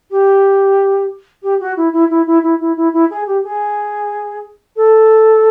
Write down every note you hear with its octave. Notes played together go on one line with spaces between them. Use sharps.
G4
G4
F#4
E4
E4
E4
E4
E4
E4
E4
E4
G#4
G4
G#4
A4